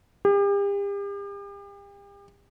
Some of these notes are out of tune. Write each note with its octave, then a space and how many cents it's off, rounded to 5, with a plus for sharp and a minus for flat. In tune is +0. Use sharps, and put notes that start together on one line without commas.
G4 +40